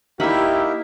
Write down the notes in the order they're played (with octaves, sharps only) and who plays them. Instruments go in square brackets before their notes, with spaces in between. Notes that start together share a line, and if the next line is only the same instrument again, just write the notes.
[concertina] A#3 A#4 E5 [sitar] D#4 [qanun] E4 B5 [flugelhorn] G4